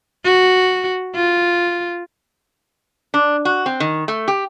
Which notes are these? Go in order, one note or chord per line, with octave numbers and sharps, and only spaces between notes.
F#4
F4
D4
F#4
C4
D#3
A3
G4